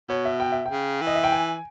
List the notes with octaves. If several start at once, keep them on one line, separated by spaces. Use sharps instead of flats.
B2 C#5
E5
G5
E5
G5
C#3
E3
D#5
E5
G5
G#5